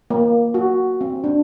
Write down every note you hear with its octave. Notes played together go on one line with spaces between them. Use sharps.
A#3
F#4
C4
D4